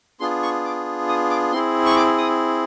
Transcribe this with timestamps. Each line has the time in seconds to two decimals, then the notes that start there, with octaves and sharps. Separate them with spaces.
0.20 B3 D4 F4 G#4 C6
0.43 C#6
0.65 D6
1.08 D#6
1.30 D6
1.52 C4 E4 G#4 C6
1.86 C#6
1.96 D6
2.18 D#6